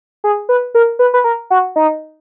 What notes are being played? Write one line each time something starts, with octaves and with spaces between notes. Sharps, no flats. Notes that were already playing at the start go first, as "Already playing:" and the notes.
G#4
B4
A#4
B4
B4
A#4
F#4
D#4